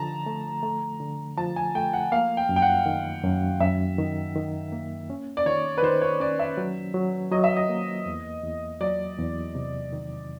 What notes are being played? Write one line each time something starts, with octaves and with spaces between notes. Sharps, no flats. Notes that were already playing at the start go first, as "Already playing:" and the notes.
Already playing: D3 F3 A5 A#5
A3
A3
D3
F3 A5
G#5
A3 G5
F#5
A#3 F5
G5
F#2
G5
F#5
D#3
F#2
F#2 E5
D#3
D#3
A#3
C#4
D5
D#3 C#5
B4
D#3 C5
C#5
C#4 D5
E5
F#3
F#3
F#3 D#5
E5
D#5
A#3
E2
E2
F#3 D5
E2
C3
D#3